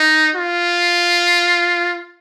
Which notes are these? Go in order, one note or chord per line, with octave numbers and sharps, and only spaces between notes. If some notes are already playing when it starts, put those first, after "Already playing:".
Already playing: D#4
F4